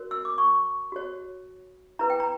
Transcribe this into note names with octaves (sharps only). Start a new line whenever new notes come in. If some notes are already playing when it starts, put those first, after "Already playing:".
Already playing: F#4 A#4 C#5
E6
D6
C#6
F#4 C#5
E4 B4 A#5
G5
A#5